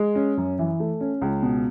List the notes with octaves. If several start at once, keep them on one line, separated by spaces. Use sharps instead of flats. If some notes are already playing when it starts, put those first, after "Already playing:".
Already playing: G#3
C#4
F#2
E3
A3
C#4
C#2
B2